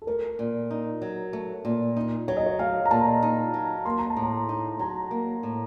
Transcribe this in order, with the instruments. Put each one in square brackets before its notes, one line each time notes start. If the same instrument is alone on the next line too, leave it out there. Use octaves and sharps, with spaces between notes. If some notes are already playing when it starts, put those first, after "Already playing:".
[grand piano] A4
[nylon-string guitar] A3 [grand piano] A#4
[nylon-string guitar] A#2
D#4
F#3
A3
A#2
D#4
[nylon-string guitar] F#3 [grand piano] C#5
[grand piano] D#5
C#5
[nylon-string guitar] A3 [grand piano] F5
[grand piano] A#5
[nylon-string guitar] A#2 [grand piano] A5
[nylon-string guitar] D#4
F#3
[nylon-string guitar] A#3 [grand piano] C6
[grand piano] A#5
A5
[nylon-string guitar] A2
[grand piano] A#5
[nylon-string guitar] D#4
[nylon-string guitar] F#3 [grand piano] A#5
[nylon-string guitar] A#3
A2